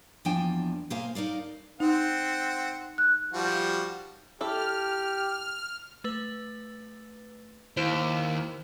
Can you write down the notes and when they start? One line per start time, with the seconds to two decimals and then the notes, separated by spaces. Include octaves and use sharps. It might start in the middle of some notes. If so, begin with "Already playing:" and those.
0.25 E2 F3 A#3 D4 G5 G#5
0.90 B2 A#3 C5 F5 G#5
1.15 D#4 A#4 D5 F5
1.80 C4 D#4 F#5
2.98 F#6
3.33 F3 G3 F#4
4.41 E4 G4 A4 F6
6.04 A3 B4
7.77 D#2 E4 C5